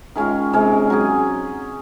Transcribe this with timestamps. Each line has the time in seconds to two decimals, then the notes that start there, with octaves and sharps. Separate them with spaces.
0.16 D#3 G#3 C#4 F4
0.53 C3 D#3 G#3 C#4
0.90 F#3 C#4 G#4